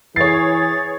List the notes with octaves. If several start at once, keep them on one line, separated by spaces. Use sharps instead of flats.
E3 G#4 C#5 A6 C7